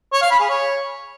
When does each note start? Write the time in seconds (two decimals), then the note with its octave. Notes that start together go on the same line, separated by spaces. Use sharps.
0.13 C#5
0.22 F5
0.31 B5
0.40 G#4
0.49 C#5